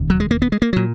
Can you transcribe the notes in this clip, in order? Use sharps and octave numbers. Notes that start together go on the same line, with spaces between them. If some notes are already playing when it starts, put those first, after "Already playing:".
Already playing: E1 D#2 C#3
F#3
G#3
A#3
B3
G#3
A#3
A#2 F#3